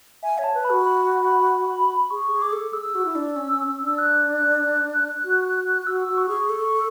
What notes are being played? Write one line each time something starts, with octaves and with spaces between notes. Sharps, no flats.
E5 G#5
C#5
A5
B4
B5
F#4
B5
G#4 C#6
G#4
D6
A4
G#4 E6
F#4
E4
D4
C#4
C#4
C#4
D4
F#6
F#4
F#4 E6
F#4
C#6
G#4
A4